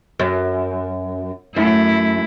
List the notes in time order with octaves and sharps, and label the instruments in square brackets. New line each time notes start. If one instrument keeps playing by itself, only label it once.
[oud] F#2
[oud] F#2 [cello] A3 E4